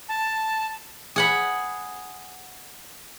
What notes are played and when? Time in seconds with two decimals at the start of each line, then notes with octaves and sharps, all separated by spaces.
0.09 A5
1.16 G#4 F#5 B5